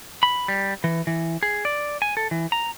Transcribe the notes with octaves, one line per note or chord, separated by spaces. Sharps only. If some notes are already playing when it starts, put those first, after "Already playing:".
B5
G3
E3
E3
G#4
D5
G#5
A4
E3
A#5